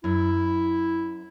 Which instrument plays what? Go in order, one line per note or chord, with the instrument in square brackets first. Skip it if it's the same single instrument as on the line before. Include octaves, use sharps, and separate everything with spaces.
[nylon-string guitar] F#2 [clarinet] E4